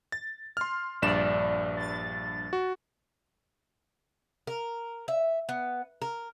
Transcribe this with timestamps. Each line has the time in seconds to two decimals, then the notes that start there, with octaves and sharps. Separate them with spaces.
0.12 A6
0.57 C6 F6
1.02 A#1 G2 D5 E7
1.77 A6
2.53 F#4
4.47 A#4
5.08 E5
5.49 B3
6.02 A#4